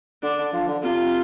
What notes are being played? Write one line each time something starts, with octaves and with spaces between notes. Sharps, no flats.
D3 D4
D3
F3
D3
C3 F4